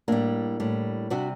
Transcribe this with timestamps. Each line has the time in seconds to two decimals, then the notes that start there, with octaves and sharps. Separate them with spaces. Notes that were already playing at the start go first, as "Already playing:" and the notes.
0.08 A2 G3 A#3 D4
0.60 A2 G3
1.10 C3 G3 D4 F#4